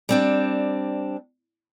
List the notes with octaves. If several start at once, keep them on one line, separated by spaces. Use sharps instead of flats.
G3 C4 D4